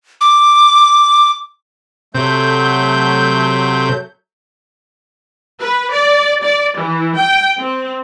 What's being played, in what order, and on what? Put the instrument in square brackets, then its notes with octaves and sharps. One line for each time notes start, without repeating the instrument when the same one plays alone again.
[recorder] D6
[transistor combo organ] C3 [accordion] F#3 A3 G6
[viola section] B4
D5
D5
E3
G5
C4